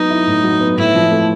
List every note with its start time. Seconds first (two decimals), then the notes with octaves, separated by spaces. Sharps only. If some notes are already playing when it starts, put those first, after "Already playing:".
Already playing: F#3 B3 D#4
0.10 E4
0.27 A2
0.44 F#3
0.60 B3
0.78 A2 E4
0.95 F3
1.12 A3